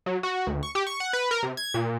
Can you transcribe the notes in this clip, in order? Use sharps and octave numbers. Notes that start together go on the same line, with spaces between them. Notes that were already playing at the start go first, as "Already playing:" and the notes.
F#3
F#4
D2
C#6
G4
C#6
F#5
B4
A#4
C3
G#6
A#2